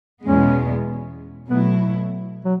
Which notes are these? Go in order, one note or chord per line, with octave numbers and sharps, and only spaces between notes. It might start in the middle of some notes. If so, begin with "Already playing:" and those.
E2 B2 G#3 B3 C#4
B2 F#3 A3 B3 E4
F#3